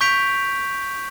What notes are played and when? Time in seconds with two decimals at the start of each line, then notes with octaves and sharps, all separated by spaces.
0.01 C#6 G6 B6 D7 F7